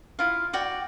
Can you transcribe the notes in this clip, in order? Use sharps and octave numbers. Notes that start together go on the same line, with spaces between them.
E4 F4 F5
F#4 D5 G5